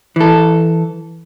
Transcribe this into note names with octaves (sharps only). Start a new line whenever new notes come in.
E3 A4